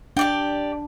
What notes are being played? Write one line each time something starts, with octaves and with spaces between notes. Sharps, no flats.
D4 G4 D5 G5